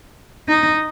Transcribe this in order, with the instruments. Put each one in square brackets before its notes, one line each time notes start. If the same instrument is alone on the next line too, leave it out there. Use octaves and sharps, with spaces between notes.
[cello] D#4